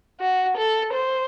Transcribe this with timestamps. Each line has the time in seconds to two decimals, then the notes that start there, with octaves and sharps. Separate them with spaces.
0.20 F#4
0.57 A4
0.93 C5